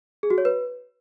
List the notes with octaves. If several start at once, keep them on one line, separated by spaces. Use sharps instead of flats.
G#4
F#4
C#5
B4